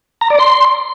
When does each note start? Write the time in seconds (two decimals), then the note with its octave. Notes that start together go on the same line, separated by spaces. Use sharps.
0.21 A#5
0.30 D5
0.39 C6